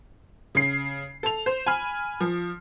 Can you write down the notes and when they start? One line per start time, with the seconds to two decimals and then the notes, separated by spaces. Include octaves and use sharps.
0.55 C#3 C7
1.23 A4 F7
1.46 C5
1.66 G#5 B5 F6
2.20 F3